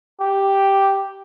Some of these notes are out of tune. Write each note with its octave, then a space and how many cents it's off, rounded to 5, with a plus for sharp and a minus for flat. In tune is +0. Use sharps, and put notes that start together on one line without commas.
G4 +0